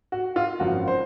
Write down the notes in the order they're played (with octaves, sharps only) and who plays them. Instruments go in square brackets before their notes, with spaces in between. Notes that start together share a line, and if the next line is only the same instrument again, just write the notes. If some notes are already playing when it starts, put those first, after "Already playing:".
[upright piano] F#4
F4
G#1 F#2 F3 F#4
C5